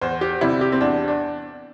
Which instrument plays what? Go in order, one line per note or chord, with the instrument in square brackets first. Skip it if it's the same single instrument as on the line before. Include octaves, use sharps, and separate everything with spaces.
[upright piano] E2 C5
G4
C3 G3 E4
G4
C4
E2 D4
D4